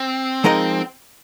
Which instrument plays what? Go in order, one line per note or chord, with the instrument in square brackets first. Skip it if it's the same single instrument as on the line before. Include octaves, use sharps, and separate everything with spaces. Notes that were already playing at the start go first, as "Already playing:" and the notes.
Already playing: [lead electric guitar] C4
[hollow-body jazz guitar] F3 G#3 D#4 A#4 D#5